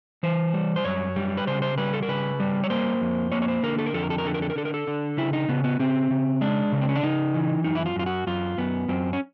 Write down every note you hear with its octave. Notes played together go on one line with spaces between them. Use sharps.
E3 C5
G3
C5
F#2 C#5
G3
B4
C#3 C5
C5
G3 B4
A4
A#4
C#3 B4
G3
C#5
A#3 C5
F2
A#3 C#5
C#5
C5
D3 A#4
A4
A#4
F2 A4
A#4
A4
A#4
D3 A4
A#4
A4
A#4
D3 A4
A#4
A4
D3
C#3 E4
D#4
C#3 B3
B3
C#3 C4
C#3
G#3 D4
C#3
C4
C#4
D4
C#3 D#4
E3
F#2 D#4
E4
F4
F#2 F4
F#4
F#2 F4
F#2 B3
F#2 C4
C#4